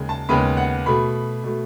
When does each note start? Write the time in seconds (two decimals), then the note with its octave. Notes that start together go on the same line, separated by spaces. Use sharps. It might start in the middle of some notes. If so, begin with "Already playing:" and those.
Already playing: D#2 C#3 G#3
0.09 A5
0.29 D#2 C#3 G#3 B3 B5
0.57 F#5
0.86 B2 A3 B5
1.43 B2 A3